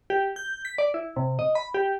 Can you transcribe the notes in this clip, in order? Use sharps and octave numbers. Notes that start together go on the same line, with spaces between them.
G4
G6
B6
D5
E4
C3
D#5
B5
G4